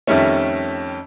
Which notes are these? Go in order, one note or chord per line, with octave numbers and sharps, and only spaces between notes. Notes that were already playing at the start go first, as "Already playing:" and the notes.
F2 D#3 G3 A3 C#4